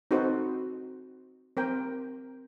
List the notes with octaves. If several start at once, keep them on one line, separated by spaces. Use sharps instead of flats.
C4 D#4 F#4 A4 B4 C5
C4 A#4 G5